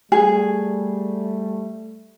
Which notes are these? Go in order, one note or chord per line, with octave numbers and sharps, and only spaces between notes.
G3 A3 G#4